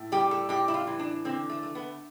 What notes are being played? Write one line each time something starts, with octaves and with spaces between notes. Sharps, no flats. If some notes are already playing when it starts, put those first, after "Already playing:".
Already playing: A2
G3 G4
A4
A2 G4
E4
F4
E3
D4
D3 C4
A3
A3
B3